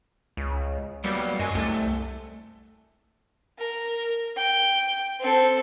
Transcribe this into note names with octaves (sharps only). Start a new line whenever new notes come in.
C#2
F#3 G3 A#3 B3
F#2 D#5 G#5
C2 A3 A4
A#4
G5
C4 A4